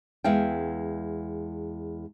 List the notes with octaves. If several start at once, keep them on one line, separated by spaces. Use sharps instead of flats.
E2 G#3 E5 F5 G5